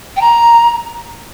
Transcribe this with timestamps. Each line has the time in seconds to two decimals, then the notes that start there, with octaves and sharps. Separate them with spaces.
0.16 G5
0.21 A#5